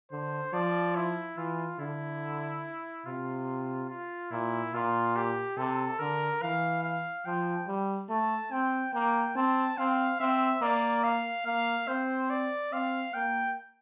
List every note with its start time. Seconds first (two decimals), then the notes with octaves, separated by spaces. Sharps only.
0.12 D3 C5
0.53 F3 D5
0.95 E4
1.37 E3 F4
1.79 D3 E4
3.06 C3 F4
3.89 F4
4.31 A#2 E4
4.74 A#2 F4
5.16 G4
5.57 C3 A4
5.99 D3 A#4
6.42 E3 F5
6.83 F5
7.25 F3 G5
7.68 G3
8.09 A3 A5
8.52 C4 G5
8.94 A#3 G5
9.36 C4 A5
9.77 C4 F5
10.20 C4 E5
10.62 A#3 D5
11.04 F5
11.46 A#3 F5
11.88 C4 C5
12.30 D5
12.72 C4 F5
13.14 A#3 G5